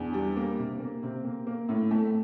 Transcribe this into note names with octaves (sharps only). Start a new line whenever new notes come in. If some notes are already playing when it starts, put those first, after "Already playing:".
Already playing: E2 D4
G3
A#3
C3
A#3
C3 C4
A#3
A#3
A2
A3